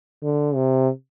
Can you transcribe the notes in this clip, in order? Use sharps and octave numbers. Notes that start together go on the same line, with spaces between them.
D3
C3